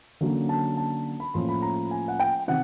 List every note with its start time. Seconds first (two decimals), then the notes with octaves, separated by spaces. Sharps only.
0.21 D3 F#3 A#3 C#4
0.49 A5
0.77 A5
1.20 B5
1.34 A2 F3 A#3 C#4 C6
1.49 B5
1.62 A#5
1.91 G#5
2.08 F#5
2.20 G5
2.48 C3 D#3 F#5